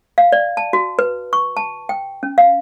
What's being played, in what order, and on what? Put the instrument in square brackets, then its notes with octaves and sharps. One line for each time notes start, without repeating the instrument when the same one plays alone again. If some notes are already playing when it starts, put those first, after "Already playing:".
[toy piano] F5
D5
A5
F#4
B4
C#6
A5
G5
C#4
F5